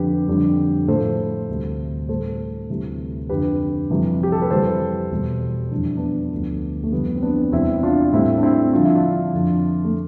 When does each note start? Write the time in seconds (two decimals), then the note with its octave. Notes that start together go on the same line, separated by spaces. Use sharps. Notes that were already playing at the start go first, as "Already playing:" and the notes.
Already playing: F2 D3 F3 G4 B4
0.28 F2 D3 G3
0.88 A2 F3 A4 C5
1.49 D2 C3 G3
2.09 A2 G3 A4 C5
2.70 D2 C3 E3 G3
3.29 F2 D3 F3 G4 B4
3.90 F2 C3 E3 G3
4.23 G4
4.32 A4
4.42 B4
4.50 F2 E3 G3 A4 C5
5.11 E2 B2 G3
5.71 F2 E3 G3 D4
5.84 E4
5.97 B3 D4
6.32 D2 D3 F3
6.84 A3
6.92 F2 E3 G3 B3
7.16 C4
7.22 B3 D4
7.52 E2 C3 G3 C4 E4
7.83 D4 F4
8.13 A2 G3 C4 E4
8.38 D4
8.43 C4 E4
8.73 G2 D3 F3 F4
8.85 E4
8.95 D4 F4
9.33 F2 D3 F3
9.85 A3